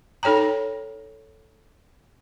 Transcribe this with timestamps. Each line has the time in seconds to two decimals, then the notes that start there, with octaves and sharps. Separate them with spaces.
0.23 D#4 A4 C#5 G5 A#5